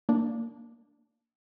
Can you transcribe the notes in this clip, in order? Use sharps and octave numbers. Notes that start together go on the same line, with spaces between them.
A#3 D4